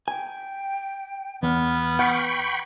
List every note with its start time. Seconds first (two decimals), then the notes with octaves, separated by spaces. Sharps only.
0.08 G5 G#5
1.43 E2 B3 F6
1.99 F#5 G5 B5 C#6